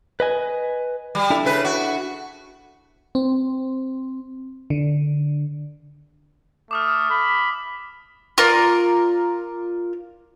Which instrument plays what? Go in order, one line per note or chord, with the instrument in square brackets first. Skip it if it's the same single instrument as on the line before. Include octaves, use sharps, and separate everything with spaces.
[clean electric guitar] B4 D#5 G#5
[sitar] G3
[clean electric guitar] D4 E4 A4
[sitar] C#3 B4
F#4
[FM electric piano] C4
D3
[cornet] A3 [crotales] D6 D#6 F6
[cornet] B5
[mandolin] F4 A#4 D5